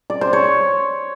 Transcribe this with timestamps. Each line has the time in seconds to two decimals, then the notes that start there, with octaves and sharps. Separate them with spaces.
0.10 D5
0.21 C5
0.33 C#5